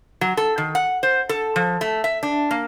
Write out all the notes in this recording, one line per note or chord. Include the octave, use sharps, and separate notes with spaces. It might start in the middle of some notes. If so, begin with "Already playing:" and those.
F#3
A4
D#3
F#5
C5
A4
F3
A3
E5
D4
A#3